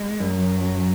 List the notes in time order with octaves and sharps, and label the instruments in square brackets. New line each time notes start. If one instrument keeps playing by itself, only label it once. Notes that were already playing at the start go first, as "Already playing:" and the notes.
Already playing: [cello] G#3
[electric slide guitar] F#2
[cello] F#3